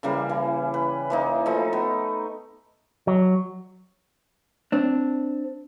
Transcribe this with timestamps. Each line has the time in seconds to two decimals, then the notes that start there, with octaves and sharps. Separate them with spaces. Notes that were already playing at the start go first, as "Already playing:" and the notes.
0.03 C#3 E3 G3 A#3
0.29 E3
0.74 B4
1.10 E3 A#3 D#4
1.46 F3 A3 D#4
1.73 B3
3.07 F#3
4.72 C4 D4